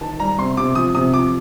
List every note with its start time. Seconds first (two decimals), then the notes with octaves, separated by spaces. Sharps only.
0.01 D#3 A5
0.20 G3 A#5
0.38 C3 C6
0.57 C3 D6
0.75 F3 D#6
0.95 C3 D#6
1.12 F3 D6